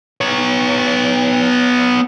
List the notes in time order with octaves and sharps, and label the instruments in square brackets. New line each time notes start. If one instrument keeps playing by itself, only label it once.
[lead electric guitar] B3 C#5